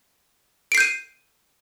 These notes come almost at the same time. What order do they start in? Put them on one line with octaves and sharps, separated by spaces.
D7 C7 G6 D#7